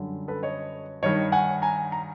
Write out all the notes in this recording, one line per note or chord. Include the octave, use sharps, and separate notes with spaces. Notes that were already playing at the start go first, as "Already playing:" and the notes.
Already playing: F#2 D3 G3
A4 B4
C#5 D#5
G2 D#3 G3 C#5 D#5
F#5 G#5
G#5 A#5
A#5